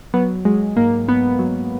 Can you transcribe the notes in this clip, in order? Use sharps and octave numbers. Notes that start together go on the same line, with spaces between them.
F#3 B3
F#3 G#3
G#2 A#3
G#2 B3
F#3